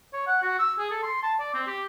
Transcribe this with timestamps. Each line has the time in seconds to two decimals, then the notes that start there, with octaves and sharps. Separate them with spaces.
0.13 C#5
0.27 F#5
0.42 F#4
0.59 E6
0.79 G#4
0.91 A4
1.03 C6
1.23 A5
1.40 D5
1.54 C4
1.67 G4